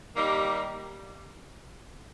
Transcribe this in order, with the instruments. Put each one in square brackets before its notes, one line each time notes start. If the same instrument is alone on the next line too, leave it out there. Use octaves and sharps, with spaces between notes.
[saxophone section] D#3 G3 A#3 D#4 G4